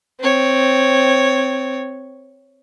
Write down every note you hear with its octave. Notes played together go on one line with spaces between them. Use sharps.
C4 C#5